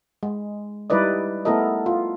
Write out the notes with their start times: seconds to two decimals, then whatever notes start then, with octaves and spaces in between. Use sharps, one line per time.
0.23 G#3
0.90 G3 D#4 E4 B4 D5 D#5
1.45 A3 B3 E4 A4 A#4 D#5
1.86 F4